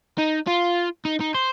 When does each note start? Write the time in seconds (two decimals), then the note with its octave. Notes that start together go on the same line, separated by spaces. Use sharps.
0.19 D#4
0.48 F4
1.05 D#4
1.20 D#4
1.35 C5